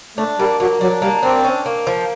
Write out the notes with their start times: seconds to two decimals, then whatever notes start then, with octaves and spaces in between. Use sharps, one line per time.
0.17 A3 D4
0.38 G3 A#3
0.60 F#3 A#3
0.81 F#3 D4
1.02 G3 A#3
1.23 C4 D4
1.44 C#4
1.66 A#3
1.87 F3